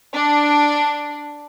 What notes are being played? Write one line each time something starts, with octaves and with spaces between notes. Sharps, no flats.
D4